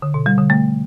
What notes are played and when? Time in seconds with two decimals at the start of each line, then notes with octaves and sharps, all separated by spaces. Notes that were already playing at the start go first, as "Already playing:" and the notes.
0.02 D3
0.14 B2
0.26 G3
0.38 D3
0.50 A3